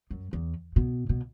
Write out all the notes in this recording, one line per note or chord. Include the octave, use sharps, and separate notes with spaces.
F#2
E2
B2
B2